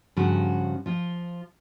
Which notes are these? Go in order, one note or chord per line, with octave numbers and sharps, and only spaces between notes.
G2 C#3 F3 F#4
F3 F4